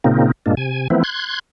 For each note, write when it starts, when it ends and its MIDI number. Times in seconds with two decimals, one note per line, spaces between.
0.04 0.32 46
0.04 0.32 49
0.04 0.32 58
0.04 0.32 60
0.04 0.32 63
0.46 0.55 43
0.46 0.55 46
0.46 0.55 56
0.46 0.55 58
0.46 0.55 62
0.57 0.88 48
0.57 0.88 80
0.90 1.03 52
0.90 1.03 53
0.90 1.03 57
0.90 1.03 59
0.90 1.03 60
0.90 1.03 64
1.04 1.39 84
1.04 1.39 90
1.04 1.39 92